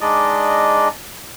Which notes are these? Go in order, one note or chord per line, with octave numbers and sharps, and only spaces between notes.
G#3 D4 D#4 D5 D#5